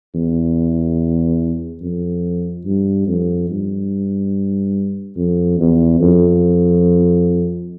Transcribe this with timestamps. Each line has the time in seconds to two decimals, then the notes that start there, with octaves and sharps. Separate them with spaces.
0.15 E2
1.81 F2
2.65 G2
3.07 F2
3.50 G2
5.17 F2
5.59 E2
6.01 F2